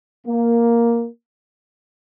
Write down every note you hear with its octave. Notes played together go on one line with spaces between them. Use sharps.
A#3